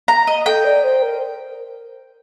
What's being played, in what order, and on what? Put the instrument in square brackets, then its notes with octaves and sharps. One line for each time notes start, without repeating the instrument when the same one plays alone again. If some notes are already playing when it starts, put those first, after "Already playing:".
[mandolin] A#5
D#5
[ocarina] A4 [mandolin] G5
[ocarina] D5
C5
A#4